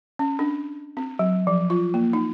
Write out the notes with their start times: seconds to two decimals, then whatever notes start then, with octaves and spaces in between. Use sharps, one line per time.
0.19 C#4
0.39 D4
0.97 C4
1.19 F#3
1.47 F3
1.70 F4
1.94 A#3
2.13 D#4